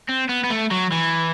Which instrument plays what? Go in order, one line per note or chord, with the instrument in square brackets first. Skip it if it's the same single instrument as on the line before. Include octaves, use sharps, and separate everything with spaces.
[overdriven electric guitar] C4
B3
B3
A3
F#3
E3